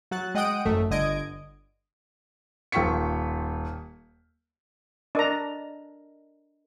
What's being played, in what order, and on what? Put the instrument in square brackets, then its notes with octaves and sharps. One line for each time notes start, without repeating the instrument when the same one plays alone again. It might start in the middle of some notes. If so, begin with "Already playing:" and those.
[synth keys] F#3 F#4 F#6 A6
G#3 D#5 F#5 G5 D#6 D7
G#1 F#2 A3
G1 D3 D#5 G#6 D7
[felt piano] D#1 F4 G5 C#6 B6 C#7
[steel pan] D4 A#5 [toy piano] A#4 D#5